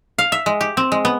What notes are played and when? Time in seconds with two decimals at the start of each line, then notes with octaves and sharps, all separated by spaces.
0.19 F5
0.32 E5
0.46 G#3
0.61 G4
0.77 C4
0.92 G#3
1.05 B3